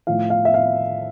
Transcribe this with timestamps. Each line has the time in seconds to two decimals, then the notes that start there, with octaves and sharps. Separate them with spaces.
0.07 A2 F3 F5
0.30 F5
0.45 E5
0.54 F5